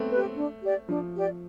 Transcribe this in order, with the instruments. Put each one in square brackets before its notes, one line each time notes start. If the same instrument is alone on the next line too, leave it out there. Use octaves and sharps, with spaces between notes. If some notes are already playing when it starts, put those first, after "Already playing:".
Already playing: [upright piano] A3 B3 C4
[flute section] G4 B4
D4
G4 D5
[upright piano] F3 [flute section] D4
[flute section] G4 D5